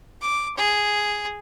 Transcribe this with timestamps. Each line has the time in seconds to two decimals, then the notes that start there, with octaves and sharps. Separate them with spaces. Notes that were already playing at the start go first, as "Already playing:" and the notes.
0.21 D6
0.57 G#4